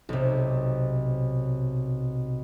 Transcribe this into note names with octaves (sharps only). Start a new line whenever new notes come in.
B1 C3